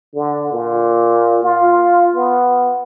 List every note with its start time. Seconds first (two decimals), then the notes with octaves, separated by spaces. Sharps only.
0.15 D3
0.53 A#2
1.43 F4
2.15 B3